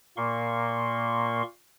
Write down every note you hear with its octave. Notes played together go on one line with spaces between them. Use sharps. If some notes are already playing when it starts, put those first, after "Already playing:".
A#2 A#3 C6 C#6